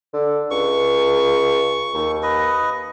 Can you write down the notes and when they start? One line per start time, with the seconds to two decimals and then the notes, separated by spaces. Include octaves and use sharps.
0.13 D3
0.51 C#2 C#6
1.94 D#2
2.23 B4 D#5